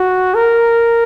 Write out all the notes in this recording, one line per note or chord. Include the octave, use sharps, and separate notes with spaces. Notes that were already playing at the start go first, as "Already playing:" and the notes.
Already playing: F#4
A#4